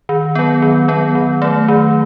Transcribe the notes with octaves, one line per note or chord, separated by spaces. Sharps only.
D#3
F#3 B3
D#3
F#3 B3
D#3
F#3 A3
D#3